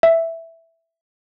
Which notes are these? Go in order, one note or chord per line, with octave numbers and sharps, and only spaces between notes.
E5